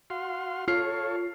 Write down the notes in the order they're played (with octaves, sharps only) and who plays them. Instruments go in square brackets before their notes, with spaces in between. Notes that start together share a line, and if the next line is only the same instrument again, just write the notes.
[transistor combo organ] F#4 F5 C6
[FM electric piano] F4 [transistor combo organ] A4 C#5 [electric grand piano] F6 C7